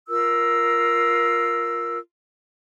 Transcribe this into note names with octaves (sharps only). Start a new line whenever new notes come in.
F4 A#4 E6